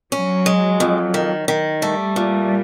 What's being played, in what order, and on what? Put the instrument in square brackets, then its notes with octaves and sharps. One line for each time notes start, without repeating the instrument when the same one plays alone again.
[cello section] F#3 [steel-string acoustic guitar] C#4
[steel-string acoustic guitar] G#3
F2
D#3
D#3
[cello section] G3 [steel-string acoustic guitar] A3
[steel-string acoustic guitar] A#2